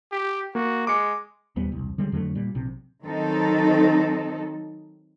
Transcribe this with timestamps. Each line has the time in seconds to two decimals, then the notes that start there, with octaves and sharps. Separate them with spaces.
0.12 G4
0.55 A#3 F#4
0.87 G#3 D6 C#7
1.56 D#1 D#2 G3 B3
1.72 E1 C2
1.98 D3 G3 G#3
2.12 F2 D3 F#3 A3
2.35 A#2 G3
2.55 A#1 C3
3.04 D#3 F#3 C4 D#4 A4